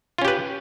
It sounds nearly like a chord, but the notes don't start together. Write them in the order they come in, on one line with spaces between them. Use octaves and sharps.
F4 C#4 G4 B4